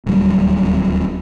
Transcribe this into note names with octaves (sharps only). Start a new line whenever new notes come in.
D1 D#2 F#3 G3